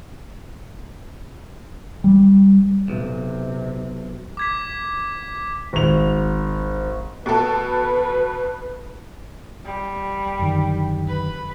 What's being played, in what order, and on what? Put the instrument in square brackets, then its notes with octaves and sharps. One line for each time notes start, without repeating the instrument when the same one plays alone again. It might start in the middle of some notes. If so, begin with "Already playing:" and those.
[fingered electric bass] G3
[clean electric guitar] B1 [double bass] C3
[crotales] D6 G#6 B6
[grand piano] G#1 F7
[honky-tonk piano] B2 A4 [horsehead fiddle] B4
[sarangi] G3
[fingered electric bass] F#2 D3 D#3
[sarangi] B4